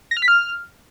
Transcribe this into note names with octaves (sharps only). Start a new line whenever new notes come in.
A#6
F6
B6
F6